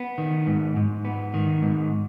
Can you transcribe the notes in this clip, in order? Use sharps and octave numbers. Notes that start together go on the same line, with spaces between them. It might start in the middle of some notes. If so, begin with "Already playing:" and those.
Already playing: B3
D#3
G#2
G#2
B3
D#3
G#2